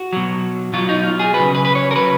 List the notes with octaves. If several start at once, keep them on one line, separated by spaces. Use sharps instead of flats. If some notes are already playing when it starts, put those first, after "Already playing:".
Already playing: F#4
B2 F#3
B2 F#3 F4
D#4
F4
G#4
F#3 B4
C#3
B4
B4
C#5
A#4
C#3 F#3 B4